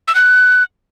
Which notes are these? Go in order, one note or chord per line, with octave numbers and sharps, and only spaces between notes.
E6
F#6